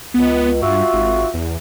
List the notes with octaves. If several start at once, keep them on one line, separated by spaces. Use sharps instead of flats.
C#2 B3
G2 F4 F#4 E5
G#1
E2